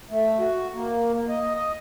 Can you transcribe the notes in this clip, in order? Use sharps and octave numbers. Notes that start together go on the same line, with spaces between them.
A3
F#4
A#3
A#3
D#5
D#5